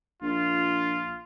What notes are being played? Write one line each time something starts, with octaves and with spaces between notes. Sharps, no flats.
A#1 F4